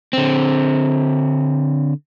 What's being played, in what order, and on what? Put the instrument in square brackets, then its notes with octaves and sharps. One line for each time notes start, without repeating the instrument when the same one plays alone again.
[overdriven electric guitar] D3 C4